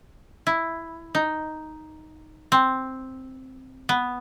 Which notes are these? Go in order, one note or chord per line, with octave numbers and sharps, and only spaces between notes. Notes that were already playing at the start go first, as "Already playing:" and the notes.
E4
D#4
C4
B3